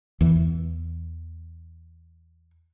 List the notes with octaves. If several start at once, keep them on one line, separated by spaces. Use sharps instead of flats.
E2 E3